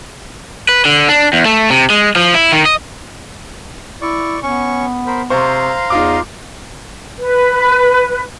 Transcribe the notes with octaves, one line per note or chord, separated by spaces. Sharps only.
B4
D3
D4
E2
A3
C3
G#3
F3
E4
D#3
D#5
E4 D5 C#6
B3 C#4 C#6
A#4 C5 B5
C3 C5 F5 A#5 C6 C#6
E2 D#4 F4 D6
B4